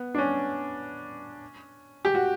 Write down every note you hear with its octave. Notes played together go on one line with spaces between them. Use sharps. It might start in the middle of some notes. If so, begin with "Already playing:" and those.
Already playing: B3
D4
C#4
G4
F#4